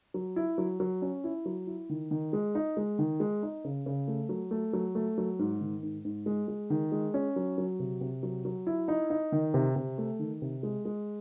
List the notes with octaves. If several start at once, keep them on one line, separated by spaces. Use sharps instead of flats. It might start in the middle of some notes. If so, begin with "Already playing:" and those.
F#3
E4
F#3
F#3
C#4
E4
F#3
E4
D#3
D#3
G#3
D#4
G#3
D#3
G#3
D#4
C#3
C#3
A3
F#3
A3
F#3
A3
F#3
G#2
D#3
G#2
G#2
G#3
G#3
D#3
G#3
C#4
F#3
F#3
C3
C3
F#3
F#3
E4
D#4
D#4
D#3
C3
C3
A3
D#3
C3
G#3
G#3